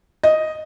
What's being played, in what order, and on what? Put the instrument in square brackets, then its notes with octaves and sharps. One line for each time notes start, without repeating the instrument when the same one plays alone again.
[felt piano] D#5